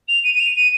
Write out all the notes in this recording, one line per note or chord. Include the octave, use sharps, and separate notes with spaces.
F7
D#7
D#7
F7
D#7